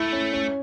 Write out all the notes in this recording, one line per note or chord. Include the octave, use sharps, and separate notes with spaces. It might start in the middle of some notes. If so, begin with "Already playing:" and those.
Already playing: A3 E4
C#4
C#4